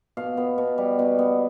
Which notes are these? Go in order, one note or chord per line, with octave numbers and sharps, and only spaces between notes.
B2 F5
B3
B2
G3
B2
B3